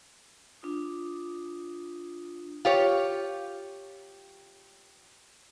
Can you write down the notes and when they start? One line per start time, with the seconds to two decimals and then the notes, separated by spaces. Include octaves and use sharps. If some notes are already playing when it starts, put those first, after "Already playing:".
0.62 D4 F4 D#6
2.65 F4 G4 C#5